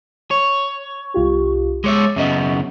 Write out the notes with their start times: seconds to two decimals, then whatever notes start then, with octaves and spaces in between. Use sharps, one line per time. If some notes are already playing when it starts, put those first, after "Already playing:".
0.31 C#5
1.14 C2 F4 G4
1.84 G#3 C#5 E5 D6 A6
2.16 F#2 C#3 B3 D#5 E5